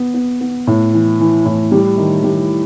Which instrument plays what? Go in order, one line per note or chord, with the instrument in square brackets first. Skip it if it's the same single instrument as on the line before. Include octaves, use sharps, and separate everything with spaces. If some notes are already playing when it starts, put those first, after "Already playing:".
Already playing: [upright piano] B3
B3
B3
A2
E3
E3
A2
G3
D#3
G3